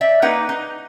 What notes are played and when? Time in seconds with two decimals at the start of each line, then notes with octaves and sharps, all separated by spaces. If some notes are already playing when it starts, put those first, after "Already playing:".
0.01 D5 E5
0.22 A#3 D#4 B4 F#5
0.49 D#4